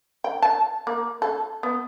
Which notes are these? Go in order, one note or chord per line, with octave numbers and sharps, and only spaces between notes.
G5
A5
A#3
A4
B3